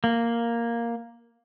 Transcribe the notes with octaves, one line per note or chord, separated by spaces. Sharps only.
A#3